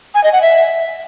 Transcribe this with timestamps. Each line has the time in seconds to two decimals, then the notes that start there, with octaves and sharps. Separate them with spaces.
0.15 G#5
0.24 D#5
0.33 F#5
0.42 E5